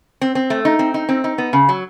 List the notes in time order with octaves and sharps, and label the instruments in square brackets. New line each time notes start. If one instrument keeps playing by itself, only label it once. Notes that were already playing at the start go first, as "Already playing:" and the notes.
[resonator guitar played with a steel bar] C4
C4
A3
D#4
C4
D#4
C4
D#4
B3
C#3
F#3